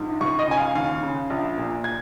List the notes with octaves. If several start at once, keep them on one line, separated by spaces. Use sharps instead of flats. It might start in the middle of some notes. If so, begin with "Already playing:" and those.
Already playing: A#1 G#2
C#2 C#6
D#5
C#3 G#5
F5
D#2 F5
C#3
A#1
A#2
G#6